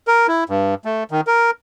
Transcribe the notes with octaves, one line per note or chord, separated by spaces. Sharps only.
A#4
E4
G2
A3
D#3
A#4